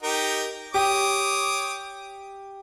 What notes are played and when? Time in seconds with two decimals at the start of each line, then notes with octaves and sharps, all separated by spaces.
0.03 D#4 G4 A#4
0.74 G4 C#5 D6 D#6